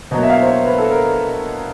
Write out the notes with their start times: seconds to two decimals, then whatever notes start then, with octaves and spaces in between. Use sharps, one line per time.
0.11 B2 F#3 A#3 D#5
0.23 E5
0.30 F5
0.41 C5
0.47 C#5
0.65 B4
0.78 A4
0.91 A#4